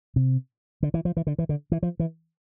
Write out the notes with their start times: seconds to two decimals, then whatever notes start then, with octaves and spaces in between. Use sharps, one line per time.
0.16 C3
0.83 D3
0.94 E3
1.05 F3
1.17 E3
1.27 D3
1.39 E3
1.49 D3
1.72 E3
1.83 F3
2.00 E3